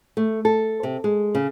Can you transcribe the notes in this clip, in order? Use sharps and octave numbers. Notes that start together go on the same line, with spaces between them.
A3
A4
C3
G#3
C#3